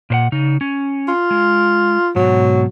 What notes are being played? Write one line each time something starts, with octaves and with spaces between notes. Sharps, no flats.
A#2 C5 F#5
C#3 D#4
C#4
F4
G#3
G#2 B2 F#3